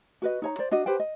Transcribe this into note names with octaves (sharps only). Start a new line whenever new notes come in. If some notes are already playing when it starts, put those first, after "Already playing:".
F#4 B4 D#5
D#4 C#5 A#5
C5 D5
D4 F#4 D#5
G4 B4 C5 G5
D#5